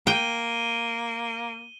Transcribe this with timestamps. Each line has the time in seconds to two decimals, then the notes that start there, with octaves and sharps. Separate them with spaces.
0.07 A#3 G5 D#7 G7